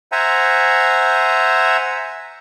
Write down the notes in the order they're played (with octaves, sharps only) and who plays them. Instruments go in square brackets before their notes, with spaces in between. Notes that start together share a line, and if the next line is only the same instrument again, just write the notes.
[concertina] C5 E5 F#5 G#5 A#5